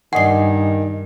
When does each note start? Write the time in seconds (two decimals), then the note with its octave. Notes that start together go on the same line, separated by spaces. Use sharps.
0.13 G2 D#3 D5 D#5 F#5 G#5 C7